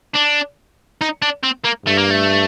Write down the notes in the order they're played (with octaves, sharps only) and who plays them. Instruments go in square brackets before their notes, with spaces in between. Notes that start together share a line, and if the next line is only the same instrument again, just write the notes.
[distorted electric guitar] D4
D#4
D4
C4
A#3
[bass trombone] G2 [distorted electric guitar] A3
[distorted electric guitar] A#3
A3